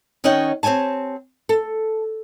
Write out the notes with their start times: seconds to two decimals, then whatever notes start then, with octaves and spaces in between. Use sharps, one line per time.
0.24 D#3 C#4 C#5 D#5 F#5 G5
0.63 C4 G4 C#5 G#5 A5
1.49 A4